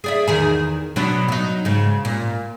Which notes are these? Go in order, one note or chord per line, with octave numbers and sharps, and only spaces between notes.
G#4 D5 E5
E2 D#3 G#4
B2 F#3 D4
F#3 D#4
G#2 C#3
A#2